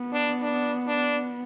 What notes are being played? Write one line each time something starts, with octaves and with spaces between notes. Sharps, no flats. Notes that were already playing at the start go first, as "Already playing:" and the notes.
Already playing: B3
D4
D4
D4